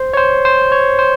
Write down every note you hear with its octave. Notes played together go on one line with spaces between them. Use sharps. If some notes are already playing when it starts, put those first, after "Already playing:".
Already playing: C5
C#5
C5
C5
C#5
C5